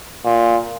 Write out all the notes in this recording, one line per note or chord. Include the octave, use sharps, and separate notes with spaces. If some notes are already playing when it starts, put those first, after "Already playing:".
A#2